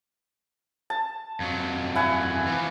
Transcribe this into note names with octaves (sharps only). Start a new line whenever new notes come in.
A5
F2 F#3
E4 F#5 G#5
E3 F3